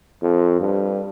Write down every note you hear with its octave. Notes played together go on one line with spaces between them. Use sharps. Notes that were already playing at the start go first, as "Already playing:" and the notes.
F2
G2